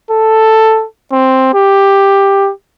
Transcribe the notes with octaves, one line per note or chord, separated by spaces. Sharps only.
A4
C4
G4